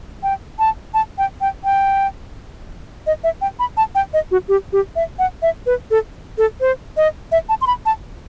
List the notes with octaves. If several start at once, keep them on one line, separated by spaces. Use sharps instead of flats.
G5
A5
A5
G5
G5
G5
D#5
E5
G5
B5
A5
G5
D#5
F#4
G4
G4
E5
F#5
E5
B4
A4
A4
C5
D#5
E5
A5
C6
B5
A5